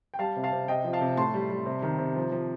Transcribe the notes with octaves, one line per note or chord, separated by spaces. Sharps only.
G5
G3 F5 A5
C3
F5 A5
C3
C3 D#5 G5
F3
F5 A5
C3
A2 A5 C6
G3
G3
C3
D#3
C3
F3
F3